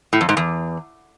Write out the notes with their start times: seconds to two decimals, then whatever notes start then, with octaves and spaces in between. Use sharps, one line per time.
0.13 A2
0.21 F2
0.29 G#2
0.37 E2